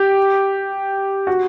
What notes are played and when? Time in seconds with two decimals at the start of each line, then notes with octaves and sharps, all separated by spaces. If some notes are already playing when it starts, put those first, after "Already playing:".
Already playing: G4
1.27 F#4